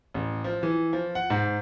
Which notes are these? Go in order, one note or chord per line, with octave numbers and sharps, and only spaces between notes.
A1
F3
E3
F3
F#5
G#2